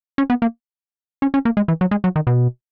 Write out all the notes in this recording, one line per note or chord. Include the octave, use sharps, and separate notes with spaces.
C#4
B3
A#3
C#4
C#4
A#3
G#3
E3
F#3
G#3
F#3
D#3
B2